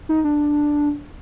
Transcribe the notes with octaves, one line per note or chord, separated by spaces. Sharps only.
D#4
D4